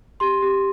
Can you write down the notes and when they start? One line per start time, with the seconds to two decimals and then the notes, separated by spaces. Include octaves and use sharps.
0.20 G4 C6
0.42 G4